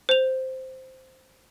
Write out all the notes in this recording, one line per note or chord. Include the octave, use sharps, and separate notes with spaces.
C5 F7